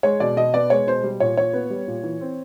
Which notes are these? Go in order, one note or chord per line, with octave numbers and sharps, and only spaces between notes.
G#3 C#5
B2 D5
B2 D#5
B3 D5
G#3 C#5
B2 C5
G3
A#2 C#5
A#2 C#5
B3
G3
A#2
E3
C4